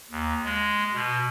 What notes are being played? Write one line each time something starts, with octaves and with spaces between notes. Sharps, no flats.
D#2
G#3
B2